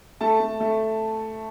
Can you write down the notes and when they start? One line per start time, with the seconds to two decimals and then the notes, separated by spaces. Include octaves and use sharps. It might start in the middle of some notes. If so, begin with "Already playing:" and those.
0.21 A3 A5
0.40 A3
0.60 A3